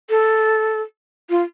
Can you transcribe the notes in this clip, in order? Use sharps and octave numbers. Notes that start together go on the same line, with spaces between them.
A4
F4